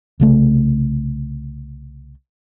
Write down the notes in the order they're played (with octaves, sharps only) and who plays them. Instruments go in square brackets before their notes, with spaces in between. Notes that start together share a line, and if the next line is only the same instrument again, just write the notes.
[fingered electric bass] C2 C#3 A3